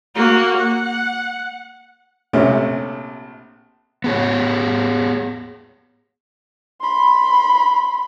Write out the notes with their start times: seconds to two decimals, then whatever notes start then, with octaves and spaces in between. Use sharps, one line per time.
0.15 A#3 F#4
0.57 F#5
2.33 A#1 C3 A3 C#4
4.04 B3 G#4 C#5
6.81 B5 C6